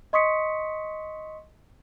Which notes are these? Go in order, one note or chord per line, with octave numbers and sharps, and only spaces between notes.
D#5 C6 C#6 D#6 B6 C#7